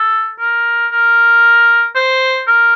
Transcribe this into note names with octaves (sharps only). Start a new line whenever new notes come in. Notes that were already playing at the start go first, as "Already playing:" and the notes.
Already playing: A4
A#4
A#4
C5
A#4